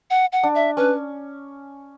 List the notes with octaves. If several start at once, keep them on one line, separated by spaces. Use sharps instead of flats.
F#5
F#5
D4
E5
C#4 B4